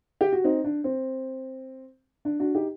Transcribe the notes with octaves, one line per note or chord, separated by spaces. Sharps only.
G4
F#4
C4 D#4
D4
C4
D4
D4 F#4
D#4 G4